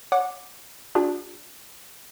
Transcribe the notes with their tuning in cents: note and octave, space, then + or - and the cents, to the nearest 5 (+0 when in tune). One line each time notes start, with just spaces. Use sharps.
C#5 +0 F#5 -20 D6 +0
D4 +0 F4 +45 G#4 -45